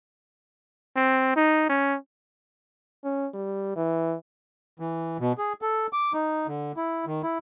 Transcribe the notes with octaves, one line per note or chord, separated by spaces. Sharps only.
C4
D#4
C#4
C#4
G3
E3
E3
B2
G#4
A4
D6
D#4
D3
E4
D#3
E4